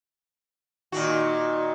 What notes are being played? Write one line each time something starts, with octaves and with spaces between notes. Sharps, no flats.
A#2 D#3 F#4